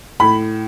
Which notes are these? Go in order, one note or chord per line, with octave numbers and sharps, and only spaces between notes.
A2 B5